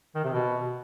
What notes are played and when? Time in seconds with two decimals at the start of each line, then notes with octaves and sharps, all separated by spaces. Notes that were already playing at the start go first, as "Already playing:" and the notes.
0.15 D#3
0.24 C3
0.33 B2